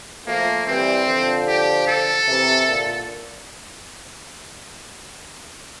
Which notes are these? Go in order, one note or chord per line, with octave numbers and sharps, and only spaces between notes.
F3 A3 A#3
E3 G3 C4
D3 F3
G4
A4
C3 E3
A#2 D3